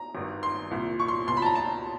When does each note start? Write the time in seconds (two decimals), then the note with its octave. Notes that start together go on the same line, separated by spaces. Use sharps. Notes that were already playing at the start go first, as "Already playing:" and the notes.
Already playing: A#5
0.15 G#1 G2 D#3
0.43 C6
0.71 C2 A#2
1.00 C#6
1.08 C6
1.27 C#2 B2 C6
1.37 B5
1.42 A5
1.46 A#5
1.55 A5